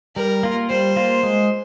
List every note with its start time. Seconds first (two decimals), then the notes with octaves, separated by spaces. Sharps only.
0.16 G3 A#4
0.43 A#3 F4
0.70 G3 C5
0.96 A#3 F4
1.23 G#3